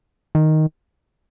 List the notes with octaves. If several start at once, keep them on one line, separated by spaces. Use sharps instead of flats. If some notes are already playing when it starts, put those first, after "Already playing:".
D#3